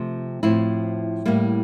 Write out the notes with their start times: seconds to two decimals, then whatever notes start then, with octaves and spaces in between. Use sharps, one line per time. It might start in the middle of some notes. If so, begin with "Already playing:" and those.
Already playing: C3 F3 A3 C4
0.43 A2 F3 C4 E4
1.25 A2 G3 A#3 E4